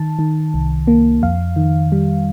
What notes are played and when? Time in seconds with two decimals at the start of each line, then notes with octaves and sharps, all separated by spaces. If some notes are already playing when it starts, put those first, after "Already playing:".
Already playing: D#3 A5
0.19 D#3
0.54 C2
0.87 A#3
1.22 F2 F5
1.56 D#3
1.92 G3